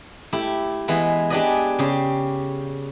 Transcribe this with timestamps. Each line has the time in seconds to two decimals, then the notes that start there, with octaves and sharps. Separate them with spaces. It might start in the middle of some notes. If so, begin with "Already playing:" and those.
0.33 A3 E4 G4
0.88 E3 G#3 B3
1.30 D4 G4 G#4 B4 D5 D#5
1.79 C#3 G4 C6